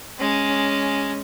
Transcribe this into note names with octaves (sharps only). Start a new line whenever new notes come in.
G#3 C#4